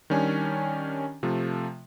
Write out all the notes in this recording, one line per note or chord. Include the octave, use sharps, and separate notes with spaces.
D#3 G3 C#4 D4 G#5
C3 F3 A3